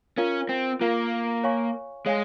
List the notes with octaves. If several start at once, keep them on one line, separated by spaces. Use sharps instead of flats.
C#4 F4 A#4 F5
C4
A#3 F4 A#4 F5
C#5 F5 G#5 C#6
G#3 C#5 F5 G#5